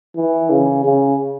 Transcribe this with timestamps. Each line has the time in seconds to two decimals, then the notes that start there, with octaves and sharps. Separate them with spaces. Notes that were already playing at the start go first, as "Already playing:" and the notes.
0.16 E3
0.50 C#3
0.84 C#3